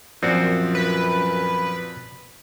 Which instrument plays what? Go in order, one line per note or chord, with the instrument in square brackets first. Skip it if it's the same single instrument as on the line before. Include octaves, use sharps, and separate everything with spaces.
[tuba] F#2 [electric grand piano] A#2 F3 D5 [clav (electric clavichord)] C4 F#4
[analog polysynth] B4